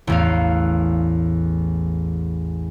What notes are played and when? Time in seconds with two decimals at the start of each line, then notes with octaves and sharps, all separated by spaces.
0.07 A1 E2 F5